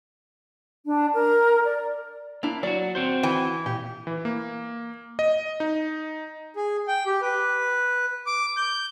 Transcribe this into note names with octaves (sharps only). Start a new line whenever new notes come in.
D4
A#4
D5
A#3 D4 E4
F#3 F4 F#4 D5
C4 F#4 C5
E3 G5
A#2 G4
E3
A#3
D#5
D#4
G#4
G5
G4
B4
D6
G6